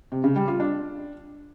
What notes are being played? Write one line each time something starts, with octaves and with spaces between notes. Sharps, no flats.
C3
C#3
G3
F4
D4